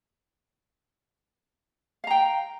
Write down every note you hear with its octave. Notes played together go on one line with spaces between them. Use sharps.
F5 G5 A#5